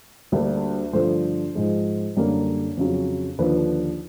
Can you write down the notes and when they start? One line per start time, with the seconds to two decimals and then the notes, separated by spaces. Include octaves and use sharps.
0.32 D2 D3 G3 A#3
0.93 G2 D3 F3 A3 C5
1.55 G#2 F3 G#3
2.16 F#2 D3 G3 A#3
2.77 F2 C#3 F#3
3.39 D#2 D3 F3 B4